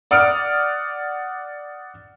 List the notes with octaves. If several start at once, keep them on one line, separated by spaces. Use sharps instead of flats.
D5 F#5 D#6 F6 D7